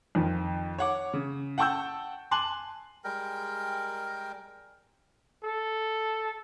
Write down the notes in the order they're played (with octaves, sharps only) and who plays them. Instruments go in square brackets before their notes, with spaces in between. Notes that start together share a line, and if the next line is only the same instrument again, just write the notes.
[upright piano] F2 D#3 F3
C#5 F#5 D6
C#3
F#5 G5 A5 C#6 E6 G6
G#5 A5 C6 D6 F#6 F#7
[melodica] G3 G#3 A#4 G5
[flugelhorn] A4